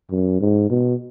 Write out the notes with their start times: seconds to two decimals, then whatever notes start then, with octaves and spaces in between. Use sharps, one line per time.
0.11 F#2
0.40 G#2
0.70 B2